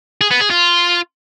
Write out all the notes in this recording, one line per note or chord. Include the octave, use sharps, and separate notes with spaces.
G#4
B3
G#4
F4